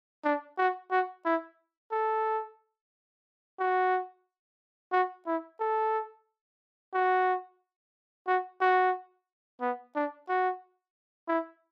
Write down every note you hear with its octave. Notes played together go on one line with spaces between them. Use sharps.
D4
F#4
F#4
E4
A4
F#4
F#4
E4
A4
F#4
F#4
F#4
B3
D4
F#4
E4